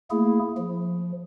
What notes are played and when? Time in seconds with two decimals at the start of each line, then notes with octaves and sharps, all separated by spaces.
0.11 A3 A#3 E4 G#4
0.57 F3